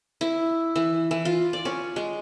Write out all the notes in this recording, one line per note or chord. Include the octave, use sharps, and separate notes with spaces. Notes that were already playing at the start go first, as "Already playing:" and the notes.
E4
E3
E3
F4
D5
C#4
G#3